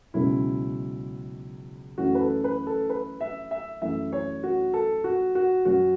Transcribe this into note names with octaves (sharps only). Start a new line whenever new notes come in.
C#2 B2 F#3 C#4 E4
F#2 E3 A3 C#4 F#4
B4
A4
B4
A4
B4
E5
E5
F#2 E3 A3 E5
C#5
F#4
A4
F#4
F#4
F#2 F#3 C#4 F#4